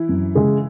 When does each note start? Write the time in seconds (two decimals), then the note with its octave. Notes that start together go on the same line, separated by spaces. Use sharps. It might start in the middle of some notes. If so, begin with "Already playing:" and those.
Already playing: E3 E4
0.09 F#2
0.35 C#3 G#3